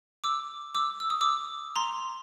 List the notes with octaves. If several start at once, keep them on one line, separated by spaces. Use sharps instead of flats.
D6 E6
D6 E6
E6
D#6
D6 E6
A#5 C6